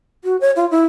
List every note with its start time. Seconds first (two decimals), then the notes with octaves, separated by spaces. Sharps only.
0.24 F#4
0.41 C#5
0.56 F4
0.71 E4